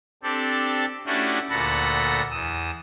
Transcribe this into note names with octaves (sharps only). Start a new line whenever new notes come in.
C4 D4 G4 A4
A3 C#4 D4 E4 F#4 G4
D2 A#2 A4 F#5 B5 A#6
E2 D#6 E6